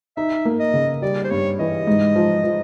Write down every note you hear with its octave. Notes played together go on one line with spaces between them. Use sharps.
D#4 E5
A#3
D#5
C#3
G3 D5
C5
G2 C#5
E3 D#5
G#2
F3
F3